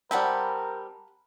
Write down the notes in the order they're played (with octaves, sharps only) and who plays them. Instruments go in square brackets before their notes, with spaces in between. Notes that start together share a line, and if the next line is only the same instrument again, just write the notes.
[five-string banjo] G3 C4 [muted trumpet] A#4 [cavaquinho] F#5 A5 B5